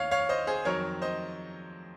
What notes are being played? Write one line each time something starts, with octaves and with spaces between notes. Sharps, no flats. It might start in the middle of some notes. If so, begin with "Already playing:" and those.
Already playing: D#2 C4 C#5 F5
C#5 F5
C5 D#5
G#4 C5
F2 D#3 F#3 C4 A#4 C#5
C5 D#5